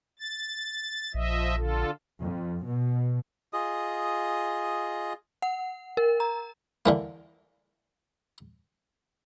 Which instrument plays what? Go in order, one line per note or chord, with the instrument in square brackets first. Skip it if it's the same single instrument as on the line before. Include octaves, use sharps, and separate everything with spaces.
[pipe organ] A6
[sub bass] A#1 [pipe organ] F3 D#5 E5
[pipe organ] D3 F4 A4
[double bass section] F2
B2
[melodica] F4 G#4 D#5 D#6
[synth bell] F#5
A#4
A#5
[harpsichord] D3 E3 A#3